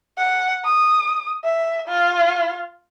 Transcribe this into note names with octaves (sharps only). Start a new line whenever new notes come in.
F#5
D#6
E5
F4